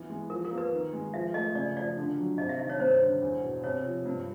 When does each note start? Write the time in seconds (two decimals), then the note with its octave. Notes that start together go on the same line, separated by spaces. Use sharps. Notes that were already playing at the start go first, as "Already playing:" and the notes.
Already playing: E3 B3
0.10 G#3
0.30 F3 A#4
0.45 A#4
0.51 A#3
0.58 B4
0.73 D#3
0.93 G#3
1.14 F3 E5
1.34 A3 D#5
1.55 C#3 D5
1.77 F3 D5
1.97 D3
2.18 F#3
2.38 C3 D#5
2.49 E5
2.60 D#3 D#5
2.69 C#5
2.80 G2 C5
3.01 D3
3.22 E2
3.42 B2
3.64 C3 C#5
3.85 F3
4.06 G2